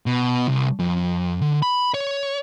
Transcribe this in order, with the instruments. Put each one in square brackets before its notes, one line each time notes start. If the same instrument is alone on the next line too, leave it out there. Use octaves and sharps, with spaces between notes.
[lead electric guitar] B2
C2
F2
D3
B5
C#5